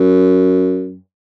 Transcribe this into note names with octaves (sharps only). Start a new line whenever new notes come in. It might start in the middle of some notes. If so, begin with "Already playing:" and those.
Already playing: F#2